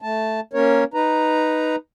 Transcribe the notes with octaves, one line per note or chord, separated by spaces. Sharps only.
A3 A5
A#3 C#4 A#4 C#5
D#4 B4 A#5